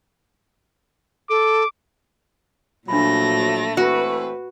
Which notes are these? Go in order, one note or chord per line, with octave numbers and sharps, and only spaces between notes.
A4 D6
A#2 F3 F#3 A3 D4 B5 A#6
E3 A3 C4 F#4 B4